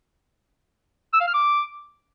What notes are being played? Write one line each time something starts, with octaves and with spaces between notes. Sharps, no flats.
E6
F5
F6
D6